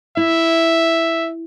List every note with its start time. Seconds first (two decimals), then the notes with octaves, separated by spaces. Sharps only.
0.17 E4 E5